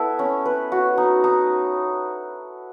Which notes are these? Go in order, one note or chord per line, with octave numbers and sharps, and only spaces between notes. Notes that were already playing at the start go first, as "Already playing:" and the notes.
Already playing: B3 E4 A4
C#4
B4
F#4
D#4
D#4